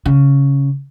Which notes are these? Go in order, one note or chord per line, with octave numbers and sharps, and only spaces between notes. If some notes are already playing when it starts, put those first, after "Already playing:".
C#3